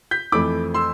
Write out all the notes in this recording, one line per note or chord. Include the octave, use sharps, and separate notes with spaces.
G6 B6
F2 E3 A3 E4 B5 D6
C6 E6